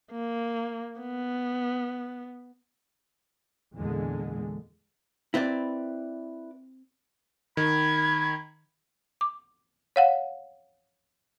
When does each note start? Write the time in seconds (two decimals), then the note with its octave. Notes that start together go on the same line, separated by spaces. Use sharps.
0.12 A#3
1.01 B3
3.76 E2 A#2 D3 G#3
5.34 C4 E4 B4 D5 A#5
7.57 D#3 B5 G#6
9.21 D6
9.96 C#5 F5 F#5